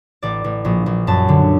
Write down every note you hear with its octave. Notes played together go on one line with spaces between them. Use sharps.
A1 D5
A1
A#1
A#1
F#2 A5
D3